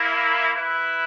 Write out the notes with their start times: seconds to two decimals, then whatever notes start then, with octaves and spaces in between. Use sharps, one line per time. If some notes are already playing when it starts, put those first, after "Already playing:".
Already playing: A#3 E4 A#4
0.54 E4 B4 E5